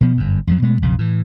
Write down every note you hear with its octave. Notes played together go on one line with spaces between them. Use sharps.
B2 F3 B3
G1 F#2
F2 F3 F#3
B2 G#3 A3
B1 F2 C#3
A2 E3